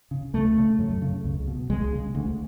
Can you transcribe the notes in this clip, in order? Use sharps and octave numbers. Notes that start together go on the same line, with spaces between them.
C#3
C#2 A3
C#3
F#2
C#3
C#2
B2
C#2 G#3
C#3
D2